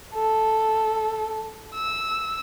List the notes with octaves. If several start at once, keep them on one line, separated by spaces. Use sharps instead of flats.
A4
E6